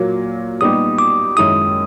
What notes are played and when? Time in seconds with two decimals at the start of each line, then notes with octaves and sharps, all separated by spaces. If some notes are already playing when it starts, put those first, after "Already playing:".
Already playing: A#2 F#3 A#3
0.61 A#2 G3 B3 D#4 G4 D#6
0.99 D6
1.37 F#2 D#3 G#3 C#4 E4 D#6